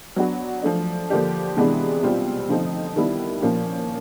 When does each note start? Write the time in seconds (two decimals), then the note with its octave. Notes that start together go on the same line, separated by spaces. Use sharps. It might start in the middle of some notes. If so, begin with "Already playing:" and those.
0.16 F#3 B3 D4 F#4
0.62 F3 A3 D4
1.10 D3 F3 A#3 D4 G4
1.57 C3 E3 G#3 B3 D4
2.03 B2 G3 C4 F4
2.49 D3 F3 A3 C4 D#4
2.96 D#3 G3 B3 E4
3.42 A#2 F3 A#3 C#4